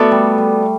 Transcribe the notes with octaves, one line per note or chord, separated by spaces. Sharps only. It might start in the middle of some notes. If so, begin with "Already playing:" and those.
Already playing: A3 B3 F#4 A4 D5
G3
G3